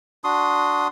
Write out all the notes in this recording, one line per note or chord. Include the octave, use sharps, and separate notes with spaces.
D4 F#4 C6 D#6